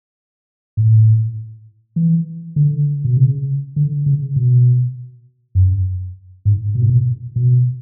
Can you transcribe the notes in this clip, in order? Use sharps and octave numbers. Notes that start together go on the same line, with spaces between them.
A2
E3
D3
B2
C#3
D3
C#3
B2
F#2
G#2
B2
A2
B2
B2